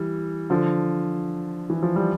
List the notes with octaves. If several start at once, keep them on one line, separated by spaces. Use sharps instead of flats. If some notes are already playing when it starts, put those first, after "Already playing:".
Already playing: E3 G3
D3 F3
E3
F3
G3